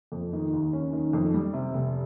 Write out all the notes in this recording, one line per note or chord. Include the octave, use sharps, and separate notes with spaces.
F2
D#3
D#2
C#4
D#3
F2
G3
C3
F1